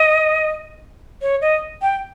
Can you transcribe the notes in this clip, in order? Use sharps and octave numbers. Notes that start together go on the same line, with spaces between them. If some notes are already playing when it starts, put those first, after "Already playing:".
Already playing: D#5
C#5
D#5
G5